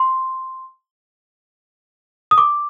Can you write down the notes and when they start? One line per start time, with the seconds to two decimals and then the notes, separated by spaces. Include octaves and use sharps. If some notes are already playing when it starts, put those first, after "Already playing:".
Already playing: C6
2.31 D#6
2.38 D6